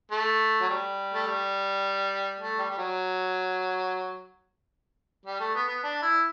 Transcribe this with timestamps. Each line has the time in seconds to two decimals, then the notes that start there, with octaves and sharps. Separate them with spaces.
0.12 A3
0.61 F#3
0.69 G3
1.14 A3
1.26 G3
2.40 A3
2.59 G3
2.70 G3
2.78 F#3
5.25 G3
5.40 A3
5.55 B3
5.68 B3
5.83 D4
6.02 E4